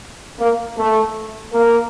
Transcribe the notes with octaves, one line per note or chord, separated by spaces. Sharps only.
A#3
A3
A#3